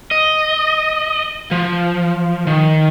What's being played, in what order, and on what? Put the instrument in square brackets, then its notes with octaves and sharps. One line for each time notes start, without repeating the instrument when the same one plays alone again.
[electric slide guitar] D#5
F3
D#3